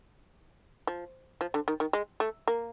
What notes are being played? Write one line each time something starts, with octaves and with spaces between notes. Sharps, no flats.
F3
F3
D3
D#3
D#3
G#3
A3
A#3